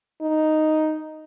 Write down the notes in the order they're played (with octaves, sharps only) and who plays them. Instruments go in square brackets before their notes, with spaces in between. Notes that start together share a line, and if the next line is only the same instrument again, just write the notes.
[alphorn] D#4